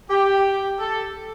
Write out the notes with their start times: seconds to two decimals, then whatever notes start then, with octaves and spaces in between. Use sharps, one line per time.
0.10 G4
0.79 A4